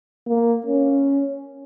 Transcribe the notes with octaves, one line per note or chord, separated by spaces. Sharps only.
A#3
C#4